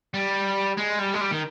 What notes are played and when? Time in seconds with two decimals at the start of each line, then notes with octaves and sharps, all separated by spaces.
0.14 G3
0.77 G#3
0.99 G3
1.14 G#3
1.21 G3
1.31 D#3